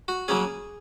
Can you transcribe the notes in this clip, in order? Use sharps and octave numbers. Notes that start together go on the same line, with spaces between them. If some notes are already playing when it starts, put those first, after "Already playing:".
F#4
C#3 F#3 A#3 C#4 G#4